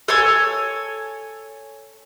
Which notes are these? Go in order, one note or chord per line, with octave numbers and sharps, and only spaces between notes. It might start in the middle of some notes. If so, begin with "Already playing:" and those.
A4 C#5 G#5 E6